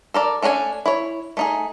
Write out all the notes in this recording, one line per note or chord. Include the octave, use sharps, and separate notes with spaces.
A4 A#4 D5
A3 C#4 D4 A#4 G#5
E4 C#5
A3 D#4 G#4